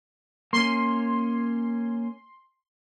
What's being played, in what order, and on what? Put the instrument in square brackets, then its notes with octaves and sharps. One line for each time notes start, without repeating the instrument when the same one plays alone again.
[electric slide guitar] A#3 C#4 [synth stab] C6